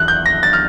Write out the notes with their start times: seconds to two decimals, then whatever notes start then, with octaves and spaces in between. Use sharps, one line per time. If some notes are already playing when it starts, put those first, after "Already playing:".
Already playing: E2 F#6
0.08 G6
0.26 A#6
0.43 A6
0.53 F6